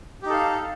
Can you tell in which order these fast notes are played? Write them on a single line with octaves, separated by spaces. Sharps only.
G4 D#4 A4 F5